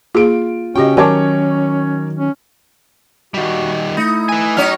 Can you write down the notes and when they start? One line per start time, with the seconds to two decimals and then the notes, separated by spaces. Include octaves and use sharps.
0.15 A#3 F4 G#4 D6 D7
0.76 C#3 C#4 F#4 G4 D#5 G5
0.97 D#3 F#3 A#4 C#5 G#5 A5 D6
2.18 C#4
3.34 D#3 G3 F#4
3.97 A3 D#4 E4
4.29 B4 G#5
4.57 F#3 C#4 D#4 C#5 F6